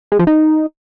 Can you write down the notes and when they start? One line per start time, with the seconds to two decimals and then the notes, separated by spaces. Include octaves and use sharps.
0.12 G#3
0.19 F3
0.27 D#4